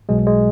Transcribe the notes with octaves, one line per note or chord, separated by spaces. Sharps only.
B1 B2 F#3 G#3
G#3